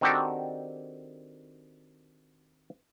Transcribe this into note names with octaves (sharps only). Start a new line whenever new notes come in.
D#3 C4 D4 F#4 G4 A4